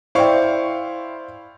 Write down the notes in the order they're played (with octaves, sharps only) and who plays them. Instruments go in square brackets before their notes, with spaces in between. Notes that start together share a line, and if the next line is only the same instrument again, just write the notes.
[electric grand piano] E4 F5 C#6 [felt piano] C5 D5 G5